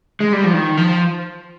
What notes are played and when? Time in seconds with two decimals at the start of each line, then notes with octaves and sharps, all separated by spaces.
0.20 G#3
0.33 G3
0.44 F3
0.54 D#3
0.77 F3